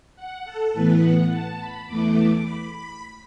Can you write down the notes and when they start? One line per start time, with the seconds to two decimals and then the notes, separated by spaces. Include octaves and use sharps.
0.16 F#5
0.45 A4
0.73 A2 E3 B3 B4
1.01 F#5
1.30 A5
1.59 B5
1.86 E2 E3 A3 D6
2.43 B5
2.72 B5